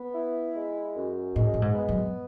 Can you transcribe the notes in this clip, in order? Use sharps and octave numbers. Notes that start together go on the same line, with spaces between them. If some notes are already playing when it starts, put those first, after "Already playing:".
Already playing: B3
E4
G#3
F#2
A2 G#3
A2
G#2
B3
F#2